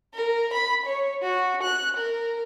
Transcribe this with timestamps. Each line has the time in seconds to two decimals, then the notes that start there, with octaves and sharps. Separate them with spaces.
0.14 A#4
0.53 B5
0.86 C#5
1.23 F#4
1.63 F#6
1.96 A#4